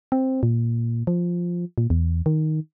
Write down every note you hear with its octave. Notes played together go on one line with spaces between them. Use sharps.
C4
A#2
F3
A#2
E2
D#3